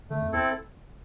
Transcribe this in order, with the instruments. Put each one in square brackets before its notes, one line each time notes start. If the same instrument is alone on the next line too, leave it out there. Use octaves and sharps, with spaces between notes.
[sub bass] D3 [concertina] A3
[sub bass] F2
[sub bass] E2 [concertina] C4 E4 A4